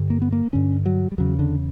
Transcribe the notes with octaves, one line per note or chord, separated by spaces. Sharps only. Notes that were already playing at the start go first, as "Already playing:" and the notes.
Already playing: G2 D3
A#3
B3
A#3
G2 D3 C#4
F#3
G3
E2 C#3 F#3
D3